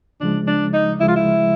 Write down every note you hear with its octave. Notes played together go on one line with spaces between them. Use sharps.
D2 C#3 F3 G#3 D4
D4
D#4
D2 C#3 F3 G#3 E4
F4
E4